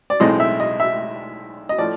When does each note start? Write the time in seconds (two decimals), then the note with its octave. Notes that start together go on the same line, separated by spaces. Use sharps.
0.10 D5
0.20 B1 A2 E3 G#3 C4 D#5
0.40 E5
0.60 D#5
0.80 E5
1.69 D#5
1.78 A2 F3 A3 D5